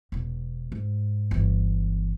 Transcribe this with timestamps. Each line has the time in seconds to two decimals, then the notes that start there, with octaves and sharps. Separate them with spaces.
0.12 E1 B2
0.72 G#2
1.31 G1 E3